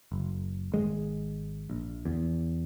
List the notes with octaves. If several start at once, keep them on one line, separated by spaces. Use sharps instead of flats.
F#1
G#1 G#3
A#1
E2